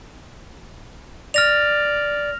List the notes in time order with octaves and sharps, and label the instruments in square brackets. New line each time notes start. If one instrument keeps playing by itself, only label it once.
[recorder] D5 [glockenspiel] F6 A#6 F7